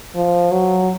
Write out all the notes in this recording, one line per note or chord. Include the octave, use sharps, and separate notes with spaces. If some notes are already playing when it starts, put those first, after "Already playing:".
F3
F#3